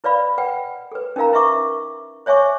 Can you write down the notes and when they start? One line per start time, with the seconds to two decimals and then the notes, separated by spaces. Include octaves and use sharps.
0.04 E4 B4 D5 F5 B5
0.38 B4 F#5 G5
0.92 A4 B4
1.16 C#4 D#4 A#4 F5 A#5
1.33 E4 B4 E5 C#6 D6
2.26 C5 C#5 E5 G#5 C#6 D6